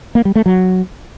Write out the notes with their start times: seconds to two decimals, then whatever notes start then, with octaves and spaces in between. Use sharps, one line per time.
0.15 A#3
0.25 G3
0.35 A3
0.46 F#3